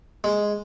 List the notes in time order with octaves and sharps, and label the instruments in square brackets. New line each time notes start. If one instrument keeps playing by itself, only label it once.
[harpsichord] G#3